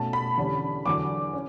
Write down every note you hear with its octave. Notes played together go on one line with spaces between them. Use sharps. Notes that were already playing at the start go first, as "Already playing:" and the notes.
Already playing: B2 A3 C#4 A5
B5
E2 D3 G3 C#4
E2 D3 F#3 D6
C#4